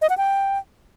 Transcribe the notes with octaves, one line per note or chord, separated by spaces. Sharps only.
D#5
F#5
G5